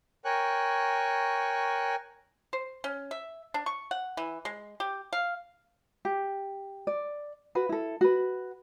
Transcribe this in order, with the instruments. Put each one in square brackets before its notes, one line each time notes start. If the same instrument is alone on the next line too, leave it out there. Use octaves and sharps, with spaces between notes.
[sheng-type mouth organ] A#4 C#5 G5 G#5 C#6 F#6
[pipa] C5
C#4
E5
D4
C#6
F#5
E3
G#3
G4
F5
[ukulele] G4
D5
F#4 B4
E4 A4
F#4 B4